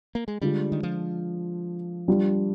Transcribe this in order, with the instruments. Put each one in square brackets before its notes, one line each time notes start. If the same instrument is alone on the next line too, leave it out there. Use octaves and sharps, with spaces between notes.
[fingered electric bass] A#3
G#3
[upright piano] D3 G#3 D4 F4 [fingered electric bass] G3
[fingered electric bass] D#3
F3
[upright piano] G3 D4 F4